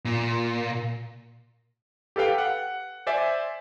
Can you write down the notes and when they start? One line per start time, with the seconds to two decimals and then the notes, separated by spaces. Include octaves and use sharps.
0.05 A#2
2.16 G4 A4 B4 F5 G5
2.38 F#5
3.07 C5 D5 E5 G#5